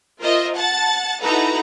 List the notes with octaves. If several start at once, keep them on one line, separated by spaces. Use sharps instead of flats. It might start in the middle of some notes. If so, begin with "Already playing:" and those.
F4 A#4 C5 D#5 E5
F#5 A5 A6
D#4 E4 F#4 A4 B4 A#5